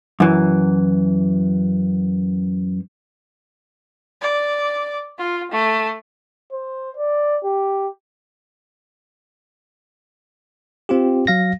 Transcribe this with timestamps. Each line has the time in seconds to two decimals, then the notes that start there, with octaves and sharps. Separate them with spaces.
0.20 F#2 E3
4.21 D5
5.18 F4
5.51 A3
6.52 C5
6.97 D5
7.44 G4
10.89 C4 F4 G4
11.27 F#3 F5 A#6